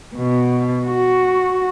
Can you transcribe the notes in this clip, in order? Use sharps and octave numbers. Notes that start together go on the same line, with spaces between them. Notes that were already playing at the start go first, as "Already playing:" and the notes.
B2
F#4